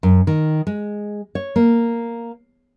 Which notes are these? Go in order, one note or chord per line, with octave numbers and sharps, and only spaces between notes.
F#2
D#3
G#3
C#5
A#3